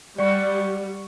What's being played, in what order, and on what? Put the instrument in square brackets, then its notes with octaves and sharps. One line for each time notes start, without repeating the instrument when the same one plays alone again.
[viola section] G3 [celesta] D5 [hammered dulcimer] F#5 C#6